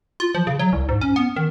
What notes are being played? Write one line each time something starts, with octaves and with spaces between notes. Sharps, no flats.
F4
F3
C#3
F#3
C2
G#2
C#4
B3
D#3